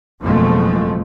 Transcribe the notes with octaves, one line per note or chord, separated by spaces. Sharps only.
F#1 F2 B2 F3 G#3 A3